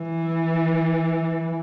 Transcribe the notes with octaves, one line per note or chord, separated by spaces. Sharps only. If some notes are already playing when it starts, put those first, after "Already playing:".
Already playing: E3